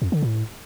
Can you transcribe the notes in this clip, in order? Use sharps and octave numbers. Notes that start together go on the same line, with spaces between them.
F2
D3
A2